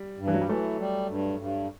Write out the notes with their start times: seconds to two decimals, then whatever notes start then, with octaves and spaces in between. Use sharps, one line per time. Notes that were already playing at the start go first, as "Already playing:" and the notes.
Already playing: G3
0.19 G2
0.28 E3
0.34 F#3
0.41 G3
0.49 E3 F#3 A3
0.79 G3
1.09 G2
1.40 G2